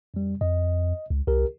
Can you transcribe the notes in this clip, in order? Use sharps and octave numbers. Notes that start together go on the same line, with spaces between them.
F2 G3
F2 D#5
C#2
C2 G4 A#4